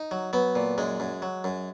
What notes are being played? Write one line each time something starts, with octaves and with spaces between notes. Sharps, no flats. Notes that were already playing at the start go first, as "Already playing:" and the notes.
Already playing: D#4
F#3
F#3 B3
A#2
F#2 G#3
F#2
F#3
F#2